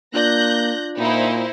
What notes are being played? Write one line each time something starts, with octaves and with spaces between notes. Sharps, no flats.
A#3 D4 F4 D5 F#6 G6 A#6
A#2 D#4 E4 C5